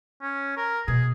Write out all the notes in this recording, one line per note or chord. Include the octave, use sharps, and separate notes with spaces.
C#4
A#4
B2 G#4